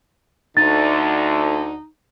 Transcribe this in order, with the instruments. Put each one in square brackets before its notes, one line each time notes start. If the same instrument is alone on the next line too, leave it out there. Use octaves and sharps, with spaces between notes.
[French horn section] D2 D3 [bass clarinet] D#4 [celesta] A6